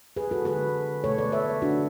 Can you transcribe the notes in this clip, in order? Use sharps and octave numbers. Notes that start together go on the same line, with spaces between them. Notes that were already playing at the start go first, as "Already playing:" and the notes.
G#4 B4
F#4 A4
D3 G#3 G#4 B4
B2 A3 A4 C#5
B4 D5
C#5 E5
D3 A3 D4 F#4